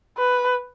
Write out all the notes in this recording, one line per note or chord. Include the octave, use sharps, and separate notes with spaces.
B4